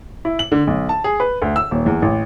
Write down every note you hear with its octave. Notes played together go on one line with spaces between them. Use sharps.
E4
F#7
D3
B1
A5
G#4
B4
D2
E6
D#1
E2
A1